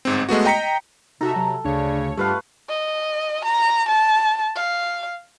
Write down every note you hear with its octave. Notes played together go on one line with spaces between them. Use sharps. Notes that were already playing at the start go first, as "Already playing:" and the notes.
G1 G#2 C4
G#3 A3 B3 F#4
D#5 G5 A#5 B6 C#7
C3 D#4 F#4 A4 E5 A#5
C3 F#3
D2 C#3 D4 C#5
G2 A3 F4 G4 B4 F5
D#5
A#5
A5
F5